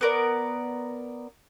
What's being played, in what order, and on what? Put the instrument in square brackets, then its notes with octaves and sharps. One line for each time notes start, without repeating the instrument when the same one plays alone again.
[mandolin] B3 A#4 D5